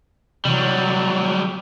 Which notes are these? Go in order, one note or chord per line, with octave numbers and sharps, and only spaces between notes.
C3 E3 F#3 G3